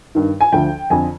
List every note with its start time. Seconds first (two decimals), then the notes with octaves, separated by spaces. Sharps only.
0.15 G2 D#3
0.41 G#5
0.52 D2 D3 F3 G5
0.90 F2 D3 F3 G#5